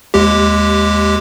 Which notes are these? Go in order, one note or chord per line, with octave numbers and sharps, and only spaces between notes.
D#2 G#3 G4